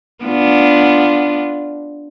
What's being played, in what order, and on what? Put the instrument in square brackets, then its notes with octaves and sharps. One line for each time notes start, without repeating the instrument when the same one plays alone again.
[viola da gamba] B3 D4 F4